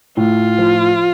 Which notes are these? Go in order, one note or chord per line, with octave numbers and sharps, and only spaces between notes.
A2 F4
F3